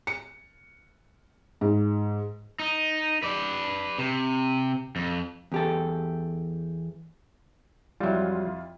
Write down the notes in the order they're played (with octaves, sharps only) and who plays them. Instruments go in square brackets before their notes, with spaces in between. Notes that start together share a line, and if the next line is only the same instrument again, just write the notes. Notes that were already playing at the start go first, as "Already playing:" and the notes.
[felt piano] C#7
G#2
[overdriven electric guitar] D#4
B4 D5
C3
F2
[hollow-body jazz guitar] E2 G4 A4
[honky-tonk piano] F2 E4 F4 [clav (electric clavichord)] F#3 G3